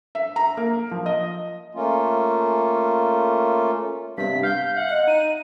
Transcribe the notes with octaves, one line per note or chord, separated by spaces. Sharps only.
E5
A#5
A#3
F3
D#5
A3 A#3 C#4 F4
G2 C3 B3 B6
F5 G6
E5 F#5
D#5
D#4 D#7